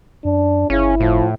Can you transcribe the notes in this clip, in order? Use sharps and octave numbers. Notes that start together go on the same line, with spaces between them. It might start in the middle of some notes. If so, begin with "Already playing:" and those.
F#2 D4
G1 C#3 C#4 E4
A2 F3